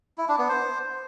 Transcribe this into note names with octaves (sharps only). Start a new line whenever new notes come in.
E4
D4
B3
C5